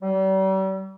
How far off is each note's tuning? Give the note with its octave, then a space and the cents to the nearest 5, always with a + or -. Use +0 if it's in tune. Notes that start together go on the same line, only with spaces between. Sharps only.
G3 -40